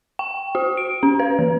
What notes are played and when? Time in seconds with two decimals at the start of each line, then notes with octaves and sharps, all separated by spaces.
0.19 G5
0.55 F#4
0.77 D7
1.03 C#4
1.19 B4
1.39 E3